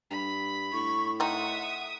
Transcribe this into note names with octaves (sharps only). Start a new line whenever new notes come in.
G2 B5
A2 C#6
C4 D#4 E5 F#5 D#6
F#5